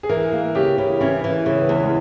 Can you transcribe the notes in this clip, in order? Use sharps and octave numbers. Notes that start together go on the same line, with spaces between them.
G#4
E3 A#4
A#3
C#3 G4
C#3 E4
E3 C#4
E3
C#3
B3
E2
G#3